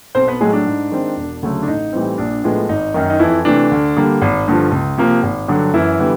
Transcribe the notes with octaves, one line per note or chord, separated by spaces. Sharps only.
B1 C4 C5
B3 B4
A2 F#3 G#3 A3 G#4
D4
G#2
D#3 G#3 C4
E1
D2 C#3 F#3 A3
D4
A1 D#4
A2 E3 G3 C4
A#1 D4
A2 F3 G#3 B3
G#1 D#4
F#2 D#3
D#4
F2 E3 E4
C3 E3 A3 D4
D2
D3 G3 A#3
G#1
G2 D3 F3
C#2
C3 F3 A#3
G#1
G2 D3 F#3
F#2 E3 E4
D3 G3 B3